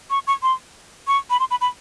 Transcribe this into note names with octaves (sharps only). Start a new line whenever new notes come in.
C#6
C#6
C6
C#6
B5
C6
B5
B5